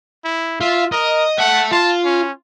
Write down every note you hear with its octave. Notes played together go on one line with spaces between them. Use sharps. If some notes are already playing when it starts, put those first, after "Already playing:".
E4
F4 E5
A#4 D#5
E5 F#5 A5
F4 A5
C#4